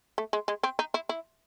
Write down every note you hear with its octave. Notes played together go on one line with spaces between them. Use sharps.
A3
G#3
G#3
C4
D#4
E4
E4